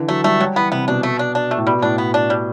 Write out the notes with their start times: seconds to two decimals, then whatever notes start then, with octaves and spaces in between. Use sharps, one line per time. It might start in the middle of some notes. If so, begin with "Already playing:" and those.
Already playing: D3 E3
0.08 F#3 A3
0.24 G3 A3
0.40 F#3 G3
0.56 E3 B3
0.72 C3 B3
0.88 B2 D4
1.03 A3
1.19 D4
1.35 D4
1.51 A3
1.57 A2
1.67 B2 G3
1.82 A2 D4
1.98 B3
2.14 D4
2.30 G3